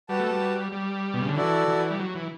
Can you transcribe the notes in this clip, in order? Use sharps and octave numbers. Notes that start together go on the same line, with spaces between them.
G3 F#4 B4 F#5 A5
A3
G3
G3
B2
C#3
D3
E3 F#4 A4 D5
E3
G3
F#3
E3